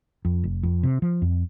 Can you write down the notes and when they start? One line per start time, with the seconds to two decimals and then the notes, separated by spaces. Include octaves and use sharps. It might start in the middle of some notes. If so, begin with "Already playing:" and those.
0.25 F2
0.44 F1
0.63 F2
0.83 C3
1.02 F3
1.22 F2